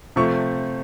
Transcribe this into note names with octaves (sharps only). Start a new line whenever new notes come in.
C3 F3 A3 C#6